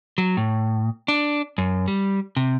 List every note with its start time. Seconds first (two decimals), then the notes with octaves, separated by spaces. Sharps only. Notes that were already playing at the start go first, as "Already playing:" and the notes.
0.18 F#3
0.37 A2
1.08 D4
1.58 F#2
1.88 G3
2.37 C3